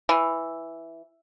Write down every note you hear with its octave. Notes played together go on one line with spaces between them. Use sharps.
E3